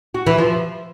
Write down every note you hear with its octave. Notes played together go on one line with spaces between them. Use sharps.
F#4
E3
F3